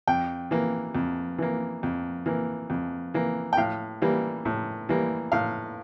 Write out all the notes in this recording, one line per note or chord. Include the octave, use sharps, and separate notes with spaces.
F2 G5
E3 A#3
F2
E3 A#3
F2
E3 A#3
F2
E3 A#3
G5
A2 F5
E3 G3 A#3
A2
E3 G3 A#3
A2 F5